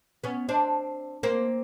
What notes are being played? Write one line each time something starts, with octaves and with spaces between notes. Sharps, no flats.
B3 C#4
C4 D4
A#3 C4